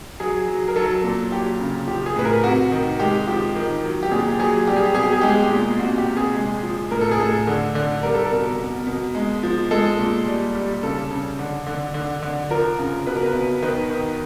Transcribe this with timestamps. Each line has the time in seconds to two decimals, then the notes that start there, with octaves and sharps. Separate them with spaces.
0.20 F#3 G#4
0.48 F#3
0.68 A#4
0.76 F#3 A4
1.04 A#2
1.32 F#3 G4
1.60 C#3
1.87 F3 G4
2.06 G#4
2.16 A2 B4
2.25 A#4
2.44 C3 F#4
2.72 D#3
3.00 G#3 G4
3.27 F3 G4
3.55 D#3
3.84 F#3
4.03 G4
4.11 A#2 G#4
4.28 G4
4.39 F#3 G#4
4.67 G3 G4
4.76 G#4
4.85 G4
4.95 B2 G#4
5.03 G4
5.13 G#4
5.21 G#3 G4
5.30 G#4
5.39 G4
5.51 A#2
5.79 C3 F#4
5.98 G4
6.07 C3
6.17 G#4
6.35 G#3
6.63 F3
6.91 A2 A#4
7.01 A4
7.11 G#4
7.20 A2 A4
7.47 D3
7.75 D3
8.03 G3 A#4
8.14 A4
8.25 A#4
8.31 B2
8.59 B2
8.87 B2
9.15 G#3
9.43 F3
9.71 G#3 A4
9.99 A#2
10.26 G3
10.55 G3
10.83 C#3 A4
11.11 C#3
11.39 D3
11.66 D3
11.94 D3
12.23 D3
12.50 F3 A#4
12.79 C#3
13.06 B2 B4
13.16 A#4
13.26 B4
13.35 B2
13.62 D#3 B4
13.90 D#3